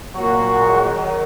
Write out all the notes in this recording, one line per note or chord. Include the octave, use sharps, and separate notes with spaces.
A#2 F#3 A#3 F#4
F#3
G#3
F#3
F#3
D#3
F#3